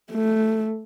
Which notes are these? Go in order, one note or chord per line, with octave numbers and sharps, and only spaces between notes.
A3